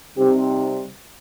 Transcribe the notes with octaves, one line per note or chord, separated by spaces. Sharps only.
C3 G3 C4 D#4 G4 C5